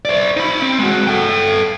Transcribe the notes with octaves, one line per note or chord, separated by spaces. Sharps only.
C5 D5
D#4 B5
C4
G#3 F#4
A4 G5